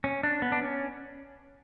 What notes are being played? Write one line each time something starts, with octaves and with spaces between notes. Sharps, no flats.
C#4
D4
B3
D4
C#4